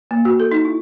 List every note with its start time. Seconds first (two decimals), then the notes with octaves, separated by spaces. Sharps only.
0.11 A#3
0.25 F#4
0.40 A4
0.52 D#4
0.65 E4